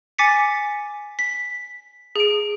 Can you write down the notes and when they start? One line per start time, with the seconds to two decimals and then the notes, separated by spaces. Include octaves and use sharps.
0.18 G#5 D6 A6 B6 C#7
1.19 B6
2.16 G#4 D7